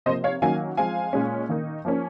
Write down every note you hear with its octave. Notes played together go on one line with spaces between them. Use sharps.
C3 F3 A#3 C5 D#5
C#5 F5
D#3 F#3 A#3 C#4 F5 G#5
F3 G#3 C4 F5 G#5
A#2 G#3 C#4
D#3 A#3 D#4
F3 A#3 C#4